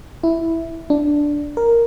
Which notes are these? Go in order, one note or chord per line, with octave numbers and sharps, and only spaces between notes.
E4
D4
A#4